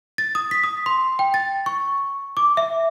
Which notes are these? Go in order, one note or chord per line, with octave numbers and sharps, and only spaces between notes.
A6
D#6
B6
D#6
C6
G5
A6
C#6
D6
E5